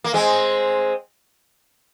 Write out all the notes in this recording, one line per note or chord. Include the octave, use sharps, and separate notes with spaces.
A#3
G#3 C4